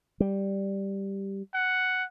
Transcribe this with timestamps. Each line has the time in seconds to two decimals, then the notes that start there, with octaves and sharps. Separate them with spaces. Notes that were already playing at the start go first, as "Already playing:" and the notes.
0.20 G3
1.54 F#5